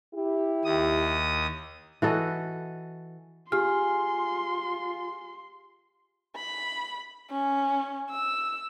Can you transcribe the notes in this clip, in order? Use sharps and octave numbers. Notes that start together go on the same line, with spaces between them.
E4 G4
D#2 D#6
E3 F#4 A4 D#5
F4 G4 G#4 C6 F6
B5
C#4
E6